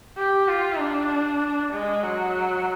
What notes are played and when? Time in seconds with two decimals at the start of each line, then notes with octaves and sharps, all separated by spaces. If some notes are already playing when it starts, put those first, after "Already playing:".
0.17 G4
0.48 F4
0.79 D4
1.73 G#3
2.03 F#3